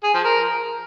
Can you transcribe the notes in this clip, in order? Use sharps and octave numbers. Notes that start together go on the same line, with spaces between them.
G#4
F3
A#4